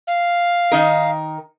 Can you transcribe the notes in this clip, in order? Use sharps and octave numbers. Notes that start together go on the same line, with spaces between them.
F5
D#3 D#4 A#4